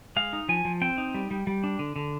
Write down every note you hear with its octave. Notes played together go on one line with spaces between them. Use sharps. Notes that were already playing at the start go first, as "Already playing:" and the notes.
G#3 F5
D#4
F3 G#5
F3
C4 G5
D#4
G3
G3
G3
D4
D3
D3